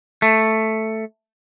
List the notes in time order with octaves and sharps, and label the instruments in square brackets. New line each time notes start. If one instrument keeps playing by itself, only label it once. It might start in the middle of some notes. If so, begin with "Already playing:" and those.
[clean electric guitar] A3